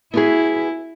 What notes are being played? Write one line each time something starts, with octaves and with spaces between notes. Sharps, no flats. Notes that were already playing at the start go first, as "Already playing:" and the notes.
B3 E4 F#4 G#4